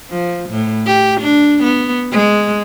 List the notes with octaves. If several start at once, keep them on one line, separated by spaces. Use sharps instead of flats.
F3
A2
G4
D4
B3
G#3